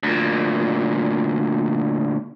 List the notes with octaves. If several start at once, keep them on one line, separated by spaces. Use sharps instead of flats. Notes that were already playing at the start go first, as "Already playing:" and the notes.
D2 A#2